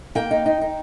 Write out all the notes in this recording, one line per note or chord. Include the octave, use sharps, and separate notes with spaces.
A#3 G5
D#4
D#4
D#4